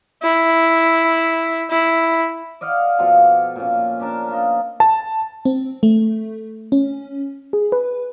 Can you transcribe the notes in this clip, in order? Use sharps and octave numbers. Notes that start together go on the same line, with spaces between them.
E4
E4
D5 D#5 F5 F#5
B2 F3 F4 A4
A#2 C#4
C#4 D4 A#4 A5
A#3 F4 D#5
A5
C4
A3
C#4
G#4
B4